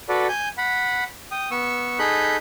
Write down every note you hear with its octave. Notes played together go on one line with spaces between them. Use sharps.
F#4 A4 B4 D5
G#5 G6
F#5 B5
G5 D#6
B3 C#6 E6
D#4 G#4 A4 B5 F#6 G6